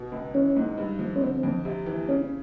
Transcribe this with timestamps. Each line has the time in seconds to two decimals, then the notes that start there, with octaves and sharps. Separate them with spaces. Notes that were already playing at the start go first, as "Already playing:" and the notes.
Already playing: B2
0.12 C#2
0.34 E3 C#4
0.56 G#2
0.78 G2
0.99 F3
1.16 C#4
1.21 D3 C4
1.43 F2
1.65 C3
1.86 E3
2.09 C#3 C#4